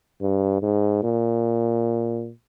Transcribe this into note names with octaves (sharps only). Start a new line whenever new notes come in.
G2
G#2
A#2